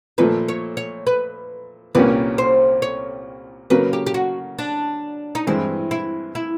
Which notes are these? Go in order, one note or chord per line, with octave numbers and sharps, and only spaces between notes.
A#2 F3 A3 B4
C#5
C#5
B4
C2 A#2 G3 A#3 C#4 B4
C5
C#5
C#3 F#3 A#3 B4
G4
G4
F#4
D4
D#4
G2 E3 G#3 C4 E4
E4
E4